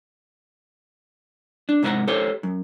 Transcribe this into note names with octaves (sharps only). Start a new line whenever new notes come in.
D4
G#2 C3 F#4 A4 F#5 A#5
G4 A4 C5 C#5 G5
F#2